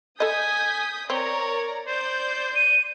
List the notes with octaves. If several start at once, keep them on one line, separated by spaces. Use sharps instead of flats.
A4 D#5 G#5 D#6 G6 B6
C4 A#4 C#5 D5 A#5
C5 D5 G6
D#7